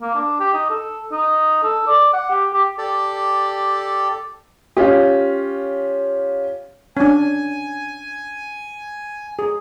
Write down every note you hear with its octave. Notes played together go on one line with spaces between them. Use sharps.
A#3
D4
G4
D#4
A4
D#4
A4
D5
F#5
G4
G4
G4 A4 D5
C#4 F4 G4
C#4 D4 G#5
G#4